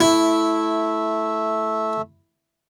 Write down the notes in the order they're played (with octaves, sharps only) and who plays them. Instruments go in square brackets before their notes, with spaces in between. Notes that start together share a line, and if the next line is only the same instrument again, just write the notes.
[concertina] A3 E5 [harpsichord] E4